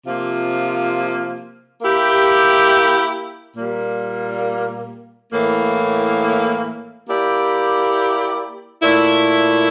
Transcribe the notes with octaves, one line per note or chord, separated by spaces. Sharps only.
C3 F3 A#3 F4
A#3 E4 G4
A#2 G3 A#3
A2 E3 A#3
A#3 E4 G4 D5
A#2 A3 E4